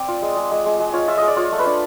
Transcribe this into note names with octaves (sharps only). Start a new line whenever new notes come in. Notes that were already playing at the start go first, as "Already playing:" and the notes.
Already playing: C4 D5
F4
G#3
G#3
G#3
G#3
G#3
F4 C#5
F4 E5
G#3 D#5
D5
F4 C#5
A3
B4
D4